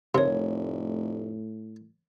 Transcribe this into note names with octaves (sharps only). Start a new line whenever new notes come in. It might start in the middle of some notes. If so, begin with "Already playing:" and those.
F1 A2 C3 A#4 C#5